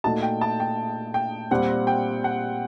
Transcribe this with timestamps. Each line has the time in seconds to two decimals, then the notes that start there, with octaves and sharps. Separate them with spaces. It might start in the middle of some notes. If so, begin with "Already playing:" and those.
0.04 A#2 A3 D#4 F#4 A5
0.23 G5
0.41 A5
0.60 G5
1.14 G5
1.51 A#2 G3 C4 F#5
1.87 G5
2.24 F#5